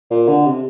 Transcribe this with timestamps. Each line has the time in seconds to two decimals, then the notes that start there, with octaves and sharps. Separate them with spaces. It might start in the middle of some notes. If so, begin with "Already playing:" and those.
0.11 A#2
0.28 D3
0.46 C3